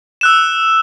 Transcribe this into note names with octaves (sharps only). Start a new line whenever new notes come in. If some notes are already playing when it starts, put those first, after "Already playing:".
E6 F#6 E7